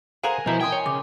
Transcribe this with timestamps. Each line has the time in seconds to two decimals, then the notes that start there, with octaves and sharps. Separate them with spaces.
0.24 G#4 A#4 C5 F5 F#5 G#5 A#5 F#6
0.46 B2 E3 F3 E4 C5 D#5 A#5
0.61 G5 C6 D#6 G#6
0.72 C#5 G#5
0.86 C#3 D6